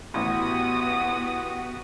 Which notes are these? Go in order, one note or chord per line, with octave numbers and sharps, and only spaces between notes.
A1 B3 F#4 G4 D#6